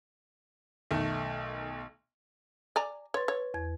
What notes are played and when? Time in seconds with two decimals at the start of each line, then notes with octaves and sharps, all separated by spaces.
0.91 B1 D#3 A3
2.76 D5 G#5 A#5
3.14 B4 C#5 C6 A6
3.28 B4 C#5
3.54 E2 G#6